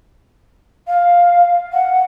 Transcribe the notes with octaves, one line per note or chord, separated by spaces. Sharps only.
F5
F#5